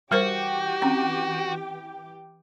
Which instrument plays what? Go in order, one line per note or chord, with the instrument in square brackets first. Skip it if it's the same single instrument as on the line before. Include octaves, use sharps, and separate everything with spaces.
[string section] E3 G4 [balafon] G3 A#4 C5 [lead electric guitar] F#4
[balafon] C4 C#4